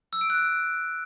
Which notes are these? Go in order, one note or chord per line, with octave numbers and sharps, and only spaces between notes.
E6
D7
F#6